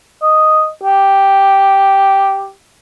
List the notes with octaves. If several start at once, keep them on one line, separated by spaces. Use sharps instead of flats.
D#5
G4